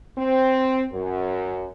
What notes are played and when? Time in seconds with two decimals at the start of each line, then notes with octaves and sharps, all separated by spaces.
0.18 C4
0.92 F#2